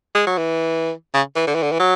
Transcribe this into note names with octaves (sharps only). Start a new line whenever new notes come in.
G#3
F#3
E3
C#3
E3
D3
E3
D3
E3
F#3